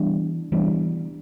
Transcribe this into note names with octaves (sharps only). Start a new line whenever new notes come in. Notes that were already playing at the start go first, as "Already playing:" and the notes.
Already playing: E3 G3 B3 D4
E3 G3 B3 D4